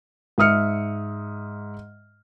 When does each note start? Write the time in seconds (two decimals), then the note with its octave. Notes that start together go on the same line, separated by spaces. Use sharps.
0.38 G#2 E5 D#6 F6 C#7